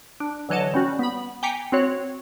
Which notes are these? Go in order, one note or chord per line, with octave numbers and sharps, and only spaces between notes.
D4
D3 E3 F#3 C#5 D#5 A5
G3 C#4 F#4
B3 B5
G5 G#5 A#5 D6 B6 C#7
C4 F#4 C#5